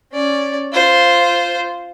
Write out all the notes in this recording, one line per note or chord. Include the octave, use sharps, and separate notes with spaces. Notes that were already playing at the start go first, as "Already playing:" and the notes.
C#4 D5
F4 C5